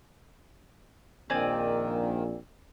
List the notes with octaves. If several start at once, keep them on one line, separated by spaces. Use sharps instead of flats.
A#1 A#2 D#3 C4 D5 G#5